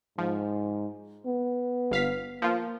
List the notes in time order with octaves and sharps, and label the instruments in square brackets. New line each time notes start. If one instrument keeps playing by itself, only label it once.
[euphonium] G#2 [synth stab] F3
[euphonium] B3
[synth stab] G1 F5 B6
[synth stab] F3 F4 [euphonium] A#3